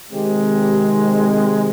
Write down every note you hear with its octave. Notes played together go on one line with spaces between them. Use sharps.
C3 D#3 G#3 C4 G4
G4